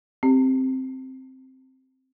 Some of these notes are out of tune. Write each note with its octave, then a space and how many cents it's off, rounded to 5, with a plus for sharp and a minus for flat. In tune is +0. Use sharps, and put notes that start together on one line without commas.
C4 +0 G4 +0